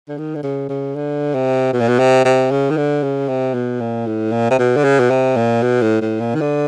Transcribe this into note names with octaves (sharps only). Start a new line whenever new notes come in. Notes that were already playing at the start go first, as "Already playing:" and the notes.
D3
D#3
D3
C#3
C#3
D3
C3
B2
A#2
B2
C3
C3
C#3
D#3
D3
C#3
C3
B2
A#2
A2
A#2
C3
B2
D3
C#3
B2
C3
A#2
B2
A2
A2
A#2
D#3
D3